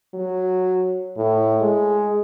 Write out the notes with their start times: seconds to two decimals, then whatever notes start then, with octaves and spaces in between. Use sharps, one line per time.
0.14 F#3
1.17 A2
1.61 G#3